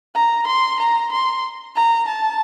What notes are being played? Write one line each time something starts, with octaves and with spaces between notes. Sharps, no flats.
A#5
C6
A#5
C6
A#5
A5